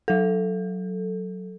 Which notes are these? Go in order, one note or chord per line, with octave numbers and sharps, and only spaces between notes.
F#3 A4